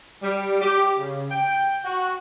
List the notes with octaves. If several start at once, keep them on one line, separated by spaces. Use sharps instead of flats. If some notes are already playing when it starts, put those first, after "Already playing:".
G3
G4
C#3
G5
F#4